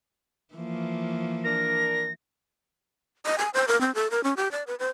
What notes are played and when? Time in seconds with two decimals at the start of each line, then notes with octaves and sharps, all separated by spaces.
0.54 E3 F3 A#3
1.44 D4 A#4 A#6
3.26 D#5
3.38 G#5
3.54 C5
3.68 A#4
3.81 C4
3.95 A4
4.11 A#4
4.24 C#4
4.37 G4
4.51 D5
4.67 B4
4.79 C5